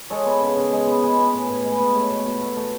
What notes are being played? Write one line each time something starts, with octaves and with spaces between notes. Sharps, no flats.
G#3 A4 C#5
B3
C#3
C#3
G#3
B3
G#3 G#4 B4
B3
A2
A2 G#4 B4
G#3
G#4 B4
B3
A3 A4 C#5
B2
B2
A3
A3